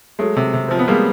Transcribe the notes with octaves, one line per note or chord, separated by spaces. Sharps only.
F#3 G#3 A3
C3
C3
F3 C4
B3
G3 G#3 A#3